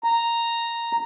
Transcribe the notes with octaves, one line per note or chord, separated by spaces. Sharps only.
A#5